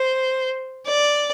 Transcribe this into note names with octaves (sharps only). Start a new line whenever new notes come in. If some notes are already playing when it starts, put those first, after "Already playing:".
Already playing: C5
D5